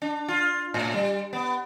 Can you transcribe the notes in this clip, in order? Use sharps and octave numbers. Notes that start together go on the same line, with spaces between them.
D4
F4
A2
G3
B3